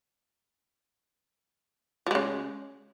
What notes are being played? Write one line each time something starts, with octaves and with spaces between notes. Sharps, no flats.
C#3 F3 G#3